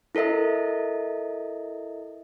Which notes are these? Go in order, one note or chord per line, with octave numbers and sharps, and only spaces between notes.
E4 A4 A#4 D#5 E5